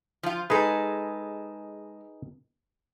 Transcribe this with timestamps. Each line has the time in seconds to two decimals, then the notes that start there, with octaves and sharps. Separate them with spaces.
0.23 F3 F4
0.50 G#3 D#4 G#4 A4 B4